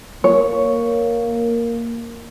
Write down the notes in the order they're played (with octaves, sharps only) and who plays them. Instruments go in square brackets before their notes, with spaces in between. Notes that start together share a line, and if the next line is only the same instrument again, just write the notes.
[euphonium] A#3 [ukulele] C#5